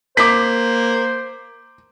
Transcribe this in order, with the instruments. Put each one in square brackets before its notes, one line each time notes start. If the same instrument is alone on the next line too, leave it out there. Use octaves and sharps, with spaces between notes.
[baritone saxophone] A#3 [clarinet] C5 [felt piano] D6 B6